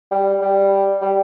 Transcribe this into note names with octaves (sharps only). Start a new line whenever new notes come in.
G3
G3
G3